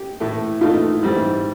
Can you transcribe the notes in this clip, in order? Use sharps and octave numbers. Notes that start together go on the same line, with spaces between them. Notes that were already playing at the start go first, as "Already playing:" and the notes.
Already playing: G4
A2 E3 A3
A2 E3 A3 D#4 F4
G#2 E3 G3 C4